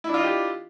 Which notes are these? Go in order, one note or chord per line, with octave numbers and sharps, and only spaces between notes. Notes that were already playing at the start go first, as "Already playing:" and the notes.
D4 E4 F4 G4 D#5